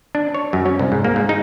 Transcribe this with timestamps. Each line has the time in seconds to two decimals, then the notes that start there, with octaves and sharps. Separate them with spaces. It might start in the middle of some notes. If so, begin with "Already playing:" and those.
0.15 D4
0.34 C#5
0.53 F#2
0.66 C#4
0.79 C2
0.92 G#2
1.05 A#3
1.16 G#2
1.29 D#4